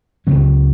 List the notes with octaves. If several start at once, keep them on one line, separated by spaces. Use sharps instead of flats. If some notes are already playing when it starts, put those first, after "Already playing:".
C#2 C#3 F#3 C#4